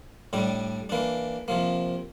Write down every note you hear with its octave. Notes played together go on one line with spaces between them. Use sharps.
A2 G3 D4
E3 A#3 D4
C3 F3 A#3